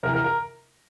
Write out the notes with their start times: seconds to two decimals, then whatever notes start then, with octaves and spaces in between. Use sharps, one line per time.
0.03 C3 E3 A#4
0.14 A#4
0.24 A#4